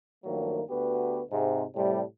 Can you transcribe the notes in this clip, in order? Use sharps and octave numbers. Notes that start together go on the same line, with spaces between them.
G2 D#3 F3 F#3 A3 A#3
D2 B3 F#4 G4 B4
G#2 C3
A2 C3 G3